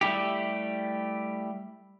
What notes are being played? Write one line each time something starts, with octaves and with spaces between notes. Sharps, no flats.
G3 A3 E4 G4